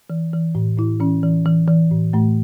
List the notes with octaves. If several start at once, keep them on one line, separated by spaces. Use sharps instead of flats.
E3
E3
A2
A2 E4
E3 C#4
E3
E3
E3
A2
A2 A3